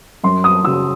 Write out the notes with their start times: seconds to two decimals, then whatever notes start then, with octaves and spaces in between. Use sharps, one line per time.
0.23 F#2 C6
0.44 D#6
0.64 C#3 F#3 E6